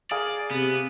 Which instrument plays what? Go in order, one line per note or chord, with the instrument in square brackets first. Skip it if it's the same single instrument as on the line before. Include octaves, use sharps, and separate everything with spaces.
[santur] G#4 A#4 F5 [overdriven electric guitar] D5
[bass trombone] C3 [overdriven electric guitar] B3